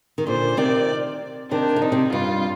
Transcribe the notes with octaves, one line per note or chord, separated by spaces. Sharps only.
D#3
A#2 D3 C5
C3 D#3 D5
C3 D#3 D4
D3
C3 D#4
C3
G2 F4